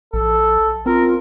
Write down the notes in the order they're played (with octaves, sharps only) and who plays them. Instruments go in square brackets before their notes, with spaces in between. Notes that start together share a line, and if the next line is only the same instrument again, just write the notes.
[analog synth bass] A#1 [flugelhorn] A4
[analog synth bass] C4 [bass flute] F4 [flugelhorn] A#4